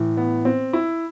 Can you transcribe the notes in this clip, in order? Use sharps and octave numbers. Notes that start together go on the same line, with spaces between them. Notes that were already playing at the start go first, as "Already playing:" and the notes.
Already playing: A2 E3
B3
C4
E4